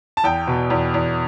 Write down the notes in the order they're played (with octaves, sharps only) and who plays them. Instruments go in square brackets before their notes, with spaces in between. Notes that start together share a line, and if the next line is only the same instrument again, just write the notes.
[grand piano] A5
E2 G5
B2
E2
E2